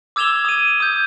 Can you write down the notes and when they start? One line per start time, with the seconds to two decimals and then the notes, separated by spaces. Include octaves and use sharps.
0.16 D6 E6 G#6 E7 F7 G7
0.45 D#6 D#7
0.80 D#6 G6